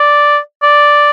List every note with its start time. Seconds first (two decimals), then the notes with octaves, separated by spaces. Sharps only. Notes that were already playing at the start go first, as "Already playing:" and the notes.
Already playing: D5
0.63 D5